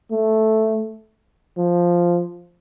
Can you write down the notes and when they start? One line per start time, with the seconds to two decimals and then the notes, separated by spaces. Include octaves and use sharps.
0.11 A3
1.58 F3